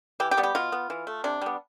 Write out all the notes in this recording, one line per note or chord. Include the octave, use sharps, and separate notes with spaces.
E3 G4
G4
G3 B3
G4
B2 F4
B3
E3
A3
C3 D4
G3 B3